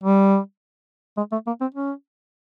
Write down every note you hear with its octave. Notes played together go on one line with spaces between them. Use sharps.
G3
G#3
A3
A#3
C4
C#4